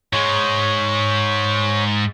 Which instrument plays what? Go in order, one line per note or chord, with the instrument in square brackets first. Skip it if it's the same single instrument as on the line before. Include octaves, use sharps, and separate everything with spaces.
[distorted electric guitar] G#2 G#3 [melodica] C#5